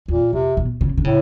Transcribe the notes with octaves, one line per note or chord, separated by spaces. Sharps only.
E2 A#2
F2 C3
B2
C#3
D3
A2 C#3